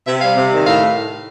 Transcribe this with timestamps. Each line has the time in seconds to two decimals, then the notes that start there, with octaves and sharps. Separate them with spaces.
0.06 C3 E5
0.21 G3 F5
0.36 C3
0.51 D#3
0.65 A2 F5